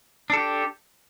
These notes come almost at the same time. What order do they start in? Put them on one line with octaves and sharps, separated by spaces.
D4 A4 G4